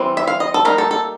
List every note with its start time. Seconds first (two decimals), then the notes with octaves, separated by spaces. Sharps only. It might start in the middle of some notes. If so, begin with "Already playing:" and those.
Already playing: E3 G3 C4
0.17 E5
0.27 F5
0.40 D#5
0.54 A4
0.65 G3 A#3 D#4 A#4
0.78 A4
0.91 A4